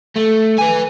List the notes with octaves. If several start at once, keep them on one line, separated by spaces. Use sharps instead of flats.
A3
B4 G#5